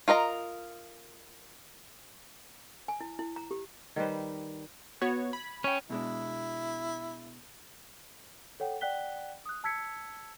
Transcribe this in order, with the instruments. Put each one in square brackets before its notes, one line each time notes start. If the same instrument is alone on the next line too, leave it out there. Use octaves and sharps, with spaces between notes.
[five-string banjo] F4 A#4 D#5 A#5
[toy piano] G#5
E4
E4
A#5
G4
[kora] D#3 G3 B4 C5
[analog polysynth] B3 F#4 C#5 [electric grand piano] G#6
[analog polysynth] B5
[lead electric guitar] C#4 [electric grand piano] C#5 G5
[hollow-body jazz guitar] B2 G#3 D4 [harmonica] E4
[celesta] A4 C#5 F#5 G5
D5 F#5 G5 F#6 B6 G7
D#6 F#6
A5 E6 G#6 B6 C#7